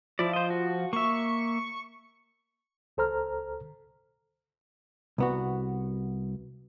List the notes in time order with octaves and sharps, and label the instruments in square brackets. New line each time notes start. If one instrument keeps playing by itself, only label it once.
[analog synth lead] F3 [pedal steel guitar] E4 D5
[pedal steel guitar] C5 D#5
F#4
[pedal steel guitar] A#3 E5 [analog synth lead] C#6
[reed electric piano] C#2 A4 C5 A#5 F6
[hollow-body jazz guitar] C2 B3 F#4